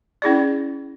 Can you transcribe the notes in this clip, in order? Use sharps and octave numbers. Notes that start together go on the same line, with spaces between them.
C#4 E4 G#4 D5